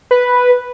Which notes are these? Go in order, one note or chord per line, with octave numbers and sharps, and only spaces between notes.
B4